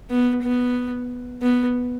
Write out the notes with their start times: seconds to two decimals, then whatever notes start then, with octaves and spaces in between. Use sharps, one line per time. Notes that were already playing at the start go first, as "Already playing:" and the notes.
0.10 B3
0.43 B3
1.42 B3